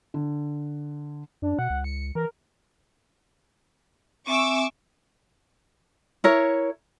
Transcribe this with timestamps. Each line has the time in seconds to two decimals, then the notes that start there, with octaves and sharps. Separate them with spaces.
0.14 D3
1.42 F#2 D4
1.59 B2 F#5
1.70 C#2
1.84 C#7
2.15 E3 A#4
4.27 C4 E5 G#5 C#6 D6 E6
6.24 E4 A#4 C#5